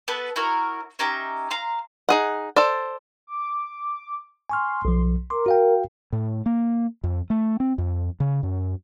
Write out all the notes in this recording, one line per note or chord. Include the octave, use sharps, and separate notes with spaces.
B3 A4 B4
E4 F#4 A#4 C#5
C#4 D#4 G4 E5
F5 A#5 C6
D#4 G#4 F#5
A4 C5 D5
D6
G#5 C6 C#6 F6
B1 F3
A#4 C6 D6
F#4 F5 G5
A2
A#3
F2
A3
C4
F2
C#3
F#2